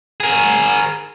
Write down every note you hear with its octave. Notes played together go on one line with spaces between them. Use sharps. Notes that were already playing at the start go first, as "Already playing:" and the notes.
G#4 A#4